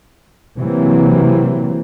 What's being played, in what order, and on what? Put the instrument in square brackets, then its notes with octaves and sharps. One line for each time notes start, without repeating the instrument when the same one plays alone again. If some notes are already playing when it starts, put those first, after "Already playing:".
[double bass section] C3 E3 F#3 A#3 C4